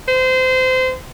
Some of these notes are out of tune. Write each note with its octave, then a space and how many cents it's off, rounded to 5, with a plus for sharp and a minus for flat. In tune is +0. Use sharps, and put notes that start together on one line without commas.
C5 -25